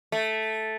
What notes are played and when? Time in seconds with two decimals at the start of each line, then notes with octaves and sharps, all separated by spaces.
0.12 A3